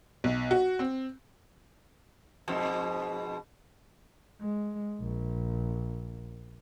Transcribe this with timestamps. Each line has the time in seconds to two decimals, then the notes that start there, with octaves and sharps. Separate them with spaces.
0.24 B1
0.51 F#4
0.79 C4
2.48 F2 G#2 B2
4.41 G#3
5.01 A#1